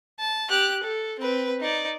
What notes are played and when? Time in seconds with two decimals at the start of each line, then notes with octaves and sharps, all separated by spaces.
0.19 A5
0.49 G4 F#6
0.83 A4
1.19 C4 B4
1.60 D#4 D5